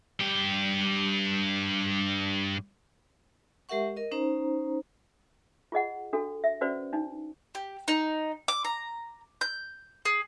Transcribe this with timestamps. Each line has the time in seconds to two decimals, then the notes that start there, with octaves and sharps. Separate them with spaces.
0.21 G2 G4
3.69 G#3 G4 A#4 E5 F#5 C#6
3.97 A#4 D#5
4.11 C#4 D#4 C5 A#5
5.72 F4 G#4 D#5 F#5
6.13 D4 F#4 A4
6.44 E5
6.61 C#4 F#4 B4 C5 D5
6.93 D4 D#4
7.55 G4
7.88 D#4
8.48 D6
8.65 A#5
9.41 G6
10.05 G#4